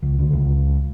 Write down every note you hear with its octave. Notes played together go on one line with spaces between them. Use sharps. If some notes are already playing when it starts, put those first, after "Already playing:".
C#2
D2
C#2